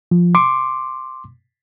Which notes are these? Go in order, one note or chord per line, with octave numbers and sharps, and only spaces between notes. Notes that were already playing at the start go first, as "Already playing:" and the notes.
F3
C6 D6